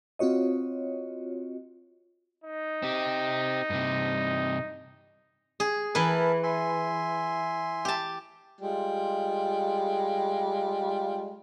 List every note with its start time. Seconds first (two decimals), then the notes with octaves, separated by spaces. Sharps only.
0.19 C4 F4 F#4 C#5 D#5
2.44 D#4
2.83 C4 G4
3.70 G2 C3
5.60 G#4
5.95 E3 A#4 B4 E5 A5
6.43 E5 G#5 C6
7.85 G4 A5
8.61 G3 G#3 F4